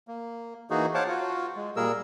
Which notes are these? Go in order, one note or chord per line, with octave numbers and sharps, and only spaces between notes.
A#3
E3 A#3 D#4 F#4 G#4
C5 C#5 F5 F#5 A5 D6
F4 F#4
G#3
A#2 G3 A#3 G#4 A#4 E6